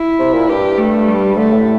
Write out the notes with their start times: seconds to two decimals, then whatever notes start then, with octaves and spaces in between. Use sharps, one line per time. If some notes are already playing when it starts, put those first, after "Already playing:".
Already playing: E4
0.19 C3
0.34 A#2
0.48 G2 G4
0.78 A3
1.08 G3
1.38 D3 A3
1.53 A2